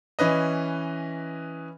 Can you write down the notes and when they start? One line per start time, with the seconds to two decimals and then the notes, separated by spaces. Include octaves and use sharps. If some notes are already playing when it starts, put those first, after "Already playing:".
0.19 E3 C#4 B4 D#5